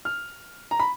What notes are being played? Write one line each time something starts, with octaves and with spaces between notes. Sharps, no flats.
F6
A#5
B5